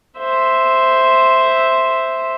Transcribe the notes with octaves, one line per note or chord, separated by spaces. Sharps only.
C5 E5